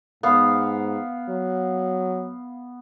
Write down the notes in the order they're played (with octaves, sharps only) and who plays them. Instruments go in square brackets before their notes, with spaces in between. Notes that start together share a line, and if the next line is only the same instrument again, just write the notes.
[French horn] G#2 [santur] B3 F5
[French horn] F#3